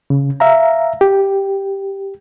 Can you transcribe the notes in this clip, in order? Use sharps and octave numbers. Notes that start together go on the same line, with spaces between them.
C#3
E5 F5 A#5
G4